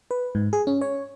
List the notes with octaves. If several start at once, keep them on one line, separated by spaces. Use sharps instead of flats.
B4
G#2
G#4
C#4
C#5